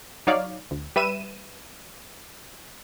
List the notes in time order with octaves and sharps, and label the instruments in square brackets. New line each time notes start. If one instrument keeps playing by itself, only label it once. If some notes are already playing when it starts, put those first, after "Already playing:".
[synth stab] F#3 D#4 C#5 D5 F5
D2
G3 B4 E5 D#7 E7